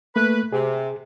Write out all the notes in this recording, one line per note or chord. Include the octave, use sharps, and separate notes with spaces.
A3 A#3 B4
C3 G#4